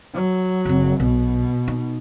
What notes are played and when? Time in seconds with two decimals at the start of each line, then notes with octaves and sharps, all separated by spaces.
0.14 F#3
0.65 F#1 C4
1.00 B1 B2
1.68 D#4